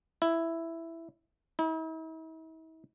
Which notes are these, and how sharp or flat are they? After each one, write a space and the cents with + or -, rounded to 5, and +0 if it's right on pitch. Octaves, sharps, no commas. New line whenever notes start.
E4 +5
E4 -45